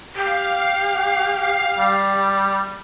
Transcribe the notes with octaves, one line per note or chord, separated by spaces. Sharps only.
G4 F5 C7
G3